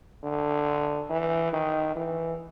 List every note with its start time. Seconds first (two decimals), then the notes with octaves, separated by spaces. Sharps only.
0.24 D3
1.10 E3
1.53 D#3
1.96 E3